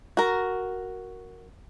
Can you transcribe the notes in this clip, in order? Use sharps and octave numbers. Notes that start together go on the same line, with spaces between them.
F#4 A#4